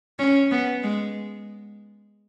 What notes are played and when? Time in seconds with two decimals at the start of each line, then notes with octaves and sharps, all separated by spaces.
0.19 C#4
0.51 B3
0.83 G#3